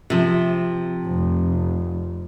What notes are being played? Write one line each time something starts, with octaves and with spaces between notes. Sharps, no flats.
C3 F3
F1